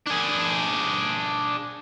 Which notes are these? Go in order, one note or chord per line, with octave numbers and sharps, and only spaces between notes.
D4 G#4